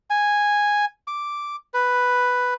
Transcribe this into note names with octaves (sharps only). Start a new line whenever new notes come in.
G#5
D6
B4